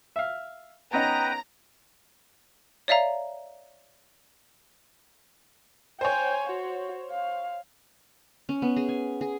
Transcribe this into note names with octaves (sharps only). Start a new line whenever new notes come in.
E5 F5
B3 C#4 D#4 B4 G5 A#5 D#6
C#5 D5 E5 F5 A#5
C5 C#5 G5 G#5
F#4
F5
C#4
B3
G#4
G#5
G#4